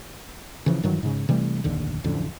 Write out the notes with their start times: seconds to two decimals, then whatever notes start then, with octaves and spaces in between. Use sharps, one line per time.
0.66 C#3 E3 F3
0.83 G2 D#3 E3 F#3
1.03 G#2 C#3
1.29 C3 E3 G3 A3
1.64 F1 A#1 D#2 D3
2.04 D1 A1 F2 D3